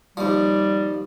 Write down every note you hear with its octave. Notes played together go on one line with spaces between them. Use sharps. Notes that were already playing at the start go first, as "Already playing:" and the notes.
D#2 F3 G3